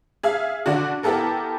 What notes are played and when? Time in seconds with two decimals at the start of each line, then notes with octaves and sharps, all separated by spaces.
0.23 G#4 E5 F5
0.66 D3 D4 F#4
1.03 B3 E4 G4 A4 A#4